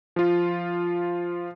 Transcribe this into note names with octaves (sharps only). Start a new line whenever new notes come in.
F3 F4